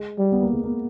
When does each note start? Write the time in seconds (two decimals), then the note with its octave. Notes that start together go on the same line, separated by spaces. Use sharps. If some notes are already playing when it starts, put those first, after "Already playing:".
Already playing: G#3
0.18 G3
0.32 B3
0.43 A#3
0.53 G#3
0.64 A#3